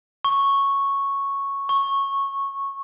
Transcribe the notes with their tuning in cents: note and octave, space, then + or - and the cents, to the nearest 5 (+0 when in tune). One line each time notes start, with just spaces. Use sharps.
C#6 -5
C#6 -15